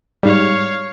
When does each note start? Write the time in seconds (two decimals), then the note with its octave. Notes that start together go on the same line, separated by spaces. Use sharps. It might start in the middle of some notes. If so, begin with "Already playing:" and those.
0.23 G#2 G3 C#5 F5